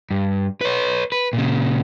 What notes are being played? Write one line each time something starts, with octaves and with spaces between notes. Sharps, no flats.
G2
B4 C#5
B4
A#2 C#3